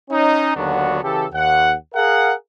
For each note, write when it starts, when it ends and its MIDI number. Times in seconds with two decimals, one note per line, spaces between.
0.10 0.54 61
0.10 0.54 63
0.56 1.01 39
0.56 1.01 50
0.56 1.01 54
0.56 1.01 59
0.56 1.01 62
0.56 1.01 66
1.03 1.26 49
1.03 1.26 52
1.03 1.26 67
1.03 1.26 69
1.32 1.74 39
1.32 1.74 78
1.94 2.33 68
1.94 2.33 70
1.94 2.33 77
1.94 2.33 78